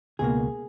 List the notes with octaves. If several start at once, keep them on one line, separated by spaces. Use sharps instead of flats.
C#2 B2 A#3 G#4